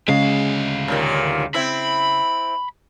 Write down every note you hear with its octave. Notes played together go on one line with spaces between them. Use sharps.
D2 C#3 G#3 F5
D#2 A#2 D#3
C4 E4 B5